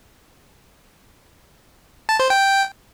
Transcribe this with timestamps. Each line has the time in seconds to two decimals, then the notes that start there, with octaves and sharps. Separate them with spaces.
2.09 A5
2.20 C5
2.30 G5